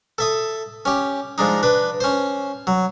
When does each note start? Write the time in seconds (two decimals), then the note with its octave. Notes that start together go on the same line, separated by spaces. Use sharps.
0.18 A4 E5 D#6
0.85 C#4 G4
1.38 F3 G#3 D4 D#4
1.63 D4 B4
2.00 C#4 C5
2.67 F#3